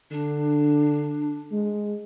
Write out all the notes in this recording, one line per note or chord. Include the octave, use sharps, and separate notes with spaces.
D3 D4
G#3